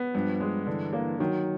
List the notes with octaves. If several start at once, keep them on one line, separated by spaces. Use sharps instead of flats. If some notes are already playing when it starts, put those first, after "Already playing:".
Already playing: B3
G2 F3
G#3
D3 E3
A#3
D#3 F#3